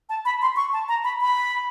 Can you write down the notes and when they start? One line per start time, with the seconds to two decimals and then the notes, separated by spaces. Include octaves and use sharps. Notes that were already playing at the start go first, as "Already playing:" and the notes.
0.09 A5
0.25 B5
0.42 C6
0.56 C#6
0.73 A5
0.88 A#5
1.04 B5
1.21 B5